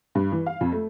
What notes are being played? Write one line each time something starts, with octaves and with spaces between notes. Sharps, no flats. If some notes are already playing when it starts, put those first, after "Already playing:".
G2
E3
F5
F2
A3